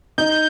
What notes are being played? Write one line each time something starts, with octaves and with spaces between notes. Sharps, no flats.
D#4 G6